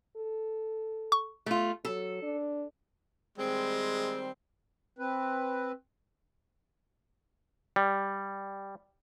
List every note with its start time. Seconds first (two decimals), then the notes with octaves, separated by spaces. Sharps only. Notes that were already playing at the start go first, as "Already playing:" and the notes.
0.17 A4
1.12 C#6
1.46 A3 F4
1.85 F#3 A4
2.22 D4
3.38 D#3 G3 G#3 C4
4.99 C4 B4
7.76 G3